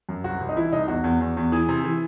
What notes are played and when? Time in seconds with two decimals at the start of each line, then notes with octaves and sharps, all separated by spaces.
0.09 F#2
0.24 C2 F#4
0.41 C2
0.49 D#4
0.56 E3 E4
0.73 C2 D#4
0.88 E2 F#4
1.04 E2
1.21 E2
1.37 E2
1.52 E3 G#4
1.69 C3
1.84 E3